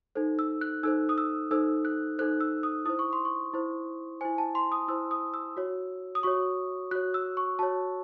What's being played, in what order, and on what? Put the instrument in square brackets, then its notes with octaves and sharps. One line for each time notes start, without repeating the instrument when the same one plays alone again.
[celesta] D#4 A4 C5
E6
F#6
D#4 A4 C5 E6
D#6
E6
D#4 A4 C5 E6
F#6
D#4 A4 C5 F#6
E6
D#6
E4 C5 D#6
C#6
C6
C#6
E4 C5
E4 C5 G#5
A5
C6
D#6
E4 C5 E6
D#6
E6
F#4 C#5
D#6
F#4 C#5 C#6
F#4 C#5 F#6
E6
C#6
F#4 C#5 A5